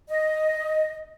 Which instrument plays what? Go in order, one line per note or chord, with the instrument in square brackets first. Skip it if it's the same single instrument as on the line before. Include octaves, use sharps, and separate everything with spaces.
[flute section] D#5